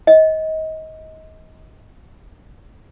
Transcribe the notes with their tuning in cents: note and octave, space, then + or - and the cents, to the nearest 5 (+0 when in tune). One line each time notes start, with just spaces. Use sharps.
D#5 +25